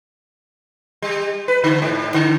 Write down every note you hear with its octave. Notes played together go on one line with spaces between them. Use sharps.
G3
B4
D3
G#2
D3